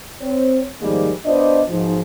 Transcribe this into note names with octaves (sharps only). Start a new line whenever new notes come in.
C4 C#5
G#2 D#3 F3 G3 G#3 A#3
B3 D4 F4 C5 D5 D#5
B1 G#2 F3